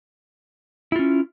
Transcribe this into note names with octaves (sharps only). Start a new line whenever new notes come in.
C#4 E4 F4